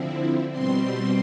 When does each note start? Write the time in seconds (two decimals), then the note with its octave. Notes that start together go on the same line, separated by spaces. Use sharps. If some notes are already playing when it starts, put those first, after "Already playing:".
Already playing: D3 F3 C4 E4
0.51 B2 G3 C4 C6